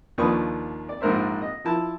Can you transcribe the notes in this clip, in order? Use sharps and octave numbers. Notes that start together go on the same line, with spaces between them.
D#2 F3 D4 B4 C#6 D#6
D5
A#1 G#2 A#4 C5 E5
D#5
F3 E4 A5